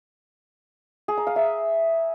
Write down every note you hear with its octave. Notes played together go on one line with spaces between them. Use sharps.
G#4
A#5
F5
E5